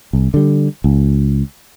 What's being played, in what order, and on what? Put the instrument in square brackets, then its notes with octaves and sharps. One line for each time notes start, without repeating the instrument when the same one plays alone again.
[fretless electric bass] C2
D3 G3
C#2